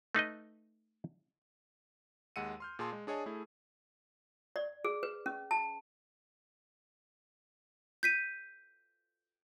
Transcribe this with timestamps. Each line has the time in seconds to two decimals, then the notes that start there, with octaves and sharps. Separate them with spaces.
0.15 A3 D#4 B4 D#5
2.36 D#2 G#3 F#5 E6 C#7 D#7
2.60 C6 F6 G6
2.79 A#2 G#4 A5 C6
2.93 G#3
3.07 D4 G#4 C#5 D#5 G#5 A5
3.26 A3 E4 G#4
4.56 D5
4.85 G#4
5.03 B4
5.26 C#4
5.51 A5
8.03 G6 B6 D#7